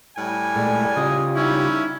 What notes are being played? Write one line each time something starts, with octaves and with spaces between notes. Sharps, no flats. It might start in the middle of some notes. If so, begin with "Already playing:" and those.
A2 G3 G#5
A#2 G#3 A3 D5
C#3 F4 G4 D#5
G3 C#4 D#4 E4